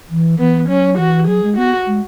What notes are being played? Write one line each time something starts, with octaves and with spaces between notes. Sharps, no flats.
E3
E3 B3
F#3 C#4
E3 F#4
F#3 G#4
G#3
B3 F#4
G#3